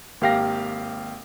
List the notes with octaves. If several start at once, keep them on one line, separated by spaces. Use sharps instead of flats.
G#1 A#3 G4 F5 G5 A#6